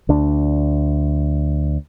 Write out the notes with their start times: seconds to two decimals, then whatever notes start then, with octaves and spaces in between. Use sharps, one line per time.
0.09 D2 D4